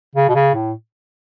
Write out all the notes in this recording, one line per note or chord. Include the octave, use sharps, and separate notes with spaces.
C#3
B2
C#3
A2